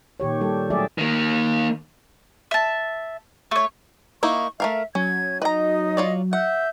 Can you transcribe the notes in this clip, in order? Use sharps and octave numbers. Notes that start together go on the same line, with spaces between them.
A#2 D#3 G4 C#5
G3 G4 A4
F#3 A3 G4 G#4 D5 E5
D#3 A#3
E5 A5
A3 C#5
A#3 D#4 E4 C#6
A3 A#4 E5 F5
F#3 C#4 G#6
D#4 B4 D#5 A#5
F4 C#5 D5
E5 F#5 G6